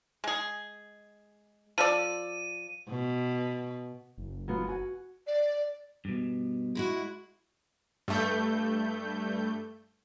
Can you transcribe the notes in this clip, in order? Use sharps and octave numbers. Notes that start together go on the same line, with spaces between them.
G#3 G#4
F3 A4 D5 D#7
B2
F#1
F#3 B3 F4
F#4 G#5
D5
G2 B2
G#3 E4 F#4
G2 A3 G6